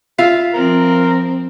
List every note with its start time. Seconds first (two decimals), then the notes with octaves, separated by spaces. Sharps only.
0.18 F4 E5 F5
0.54 F3 C4 A#4